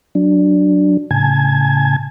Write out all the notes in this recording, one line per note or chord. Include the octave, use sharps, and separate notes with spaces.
F#3 D4
A2 C#3 G#5 A5 G#6